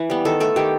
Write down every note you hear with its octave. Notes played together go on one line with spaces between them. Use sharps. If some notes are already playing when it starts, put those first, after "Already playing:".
Already playing: E3 B4
G3 B3
D#3 A4
A3 A4
D#3 G4